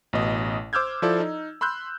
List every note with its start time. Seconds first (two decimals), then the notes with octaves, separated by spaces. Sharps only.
0.13 A1 B2 D#5
0.73 C5 D6 E6 F6 G6 G#6
1.02 F3 E4 F4 A4 D5
1.20 D#4
1.61 B5 C6 E6 F#6 G6